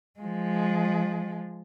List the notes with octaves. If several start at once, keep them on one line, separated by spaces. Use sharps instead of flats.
F3 G#3